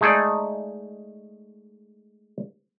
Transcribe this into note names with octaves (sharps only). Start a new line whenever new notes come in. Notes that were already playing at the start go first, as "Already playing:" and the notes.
G#3 A3 D#4 G#4 A4 D5